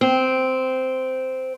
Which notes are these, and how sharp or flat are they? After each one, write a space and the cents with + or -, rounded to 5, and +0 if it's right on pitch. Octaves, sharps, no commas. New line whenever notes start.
C4 -10